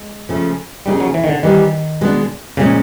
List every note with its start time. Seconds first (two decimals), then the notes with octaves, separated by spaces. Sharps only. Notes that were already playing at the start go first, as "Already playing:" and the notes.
Already playing: G#3
0.29 C#3 F3 A3 C#4
0.86 C#3 F3 G3 A#3 D#4 G#4
1.00 F#3
1.14 E3
1.24 D#3
1.29 D3
1.43 D#3 E3 G3 C4 D#4 G4
2.01 B2 G#3 B3 D4
2.57 A#2 C#3 F3 G#3 C#4